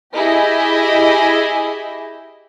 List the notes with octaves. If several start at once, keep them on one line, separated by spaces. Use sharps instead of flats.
E4 G4 G#4 D#5